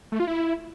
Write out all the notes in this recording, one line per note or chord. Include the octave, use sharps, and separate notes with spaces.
A3
F4
E4